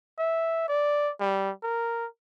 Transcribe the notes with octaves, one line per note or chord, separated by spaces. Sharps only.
E5
D5
G3
A#4